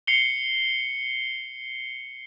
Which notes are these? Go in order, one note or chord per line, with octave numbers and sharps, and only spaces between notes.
C7 C#7 F7 G7